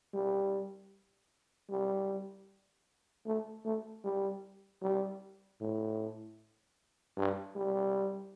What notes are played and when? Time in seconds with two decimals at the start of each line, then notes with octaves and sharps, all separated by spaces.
0.14 G3
1.70 G3
3.26 A3
3.65 A3
4.04 G3
4.82 G3
5.60 A2
7.17 G2
7.56 G3